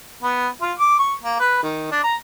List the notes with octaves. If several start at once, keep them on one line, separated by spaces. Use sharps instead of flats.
B3
F4
D6
C#6
A#3
B4
D#3
D4
A#5